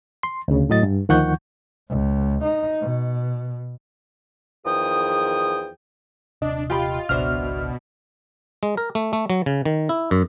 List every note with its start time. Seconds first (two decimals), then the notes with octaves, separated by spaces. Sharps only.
0.23 C6
0.48 D2 C#3
0.70 A2 F#3 D#5 A6
0.83 G2
1.09 D2 D#3 F3 F#5 C#6 G6
1.89 C#2
2.44 D#4
2.81 B2
4.66 E2 D#3 F3 G#4 G5 D#6
6.42 D#1 C3 D4 D#5
6.70 F4 G4 G5 B5
7.09 G#1 C#2 B2 D4 C5 E5 F6
8.63 G#3
8.77 A#4
8.95 A3
9.13 A3
9.30 F#3
9.46 C#3
9.65 D#3
9.89 E4
10.11 F#2